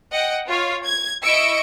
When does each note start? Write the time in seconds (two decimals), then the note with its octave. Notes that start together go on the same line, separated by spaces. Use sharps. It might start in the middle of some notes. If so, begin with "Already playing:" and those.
0.12 D#5 F#5 G5
0.47 F4 C#5 F5
0.83 G#6
1.23 E4 D#5 C#6 E6 C#7 D7